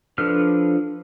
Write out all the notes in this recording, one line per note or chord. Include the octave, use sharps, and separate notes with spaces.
F3 D4 A4 B4 F6